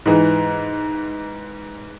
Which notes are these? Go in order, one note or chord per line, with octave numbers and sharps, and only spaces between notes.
G#2 E3